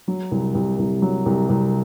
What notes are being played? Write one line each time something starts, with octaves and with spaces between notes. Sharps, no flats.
F#3
C2
C2
C2
F#3
C2
C2